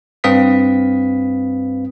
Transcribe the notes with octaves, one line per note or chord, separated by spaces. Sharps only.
G2 C4 B4 F5 D#6 B6